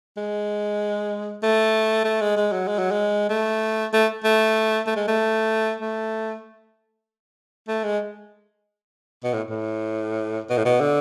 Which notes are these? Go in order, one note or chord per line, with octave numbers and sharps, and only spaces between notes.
G#3
A3
A3
G#3
G#3
F#3
G#3
F#3
G#3
A3
A3
A3
A3
G#3
A3
A3
A3
G#3
B2
A2
A2
B2
A2
B2
D3